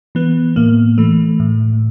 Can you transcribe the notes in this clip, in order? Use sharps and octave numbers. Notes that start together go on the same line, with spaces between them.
E3 B3
A2 A#3
E3 A3
A2